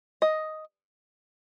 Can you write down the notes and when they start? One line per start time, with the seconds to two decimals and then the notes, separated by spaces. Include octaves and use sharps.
0.22 D#5